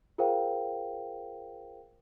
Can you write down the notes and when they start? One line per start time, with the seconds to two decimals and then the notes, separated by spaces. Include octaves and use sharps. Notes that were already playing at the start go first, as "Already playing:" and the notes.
0.18 F4 G#4 A#4 C5 F5 G5